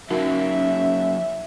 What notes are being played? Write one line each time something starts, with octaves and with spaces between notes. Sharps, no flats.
F#3 A#3 C#4 D#4 F#4 A#4 E5